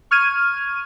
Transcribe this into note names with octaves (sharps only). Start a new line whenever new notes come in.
C#6 F6 G#6 D#7